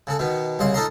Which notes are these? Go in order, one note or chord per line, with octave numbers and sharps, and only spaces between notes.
C#3 A4
B2 D#3 B3
C2 C#3 D#5 C6
D#4 F4 A4 D#5 A#5 C6